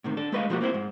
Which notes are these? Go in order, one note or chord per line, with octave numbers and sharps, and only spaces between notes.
A2 C3 D#3
D4 A4
G#3 A3 B4 D5 D#5 F5
B2 F3 G3 A#3 F#4 G4
A#3 C4 E4 C5
G#2